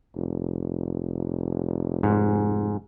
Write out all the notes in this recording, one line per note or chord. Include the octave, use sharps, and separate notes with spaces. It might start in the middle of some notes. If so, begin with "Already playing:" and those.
F1
G#2